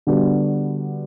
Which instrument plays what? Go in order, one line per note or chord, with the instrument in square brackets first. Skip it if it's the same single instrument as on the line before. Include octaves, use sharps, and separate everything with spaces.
[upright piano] D3 G3 B3 F#4